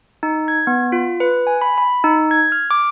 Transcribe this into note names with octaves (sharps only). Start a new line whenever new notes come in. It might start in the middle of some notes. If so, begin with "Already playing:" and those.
D#4
G#6
B3
F4
B4
G#5
B5
B5
D#4
G#6
F6
D6